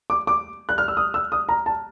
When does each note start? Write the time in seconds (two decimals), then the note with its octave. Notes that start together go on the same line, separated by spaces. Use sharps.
0.10 D6
0.27 D6
0.69 F#6
0.78 F6
0.88 E6
0.97 D#6
1.14 E6
1.32 D#6
1.49 A#5
1.66 A5